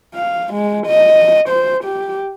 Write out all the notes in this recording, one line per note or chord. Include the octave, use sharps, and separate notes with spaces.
F5
G#3
D#5
C5
G4